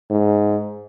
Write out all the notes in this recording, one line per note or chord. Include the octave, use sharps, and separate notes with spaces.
G#2